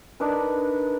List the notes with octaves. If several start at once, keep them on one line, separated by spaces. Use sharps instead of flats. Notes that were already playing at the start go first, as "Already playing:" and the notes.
D4 D#4 A#4 B4